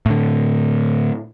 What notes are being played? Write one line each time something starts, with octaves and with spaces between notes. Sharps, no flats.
A2 D3